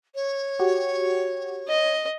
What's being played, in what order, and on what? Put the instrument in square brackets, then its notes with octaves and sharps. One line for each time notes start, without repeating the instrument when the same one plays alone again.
[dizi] C#5
[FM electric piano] F#4 G4
[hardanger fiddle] D#5